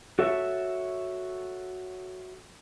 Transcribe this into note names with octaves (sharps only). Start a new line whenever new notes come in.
F#4 A4 C#5 E5